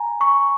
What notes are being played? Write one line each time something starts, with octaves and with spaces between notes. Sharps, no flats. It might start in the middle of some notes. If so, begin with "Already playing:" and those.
Already playing: G#5 A#5
C#6